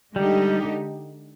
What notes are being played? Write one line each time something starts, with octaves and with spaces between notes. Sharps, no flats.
D3 G3 G#3 D#4 G4